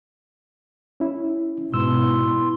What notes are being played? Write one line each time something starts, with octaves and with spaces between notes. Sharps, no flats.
C#4 E4
G#2 B2 E4 C6 E6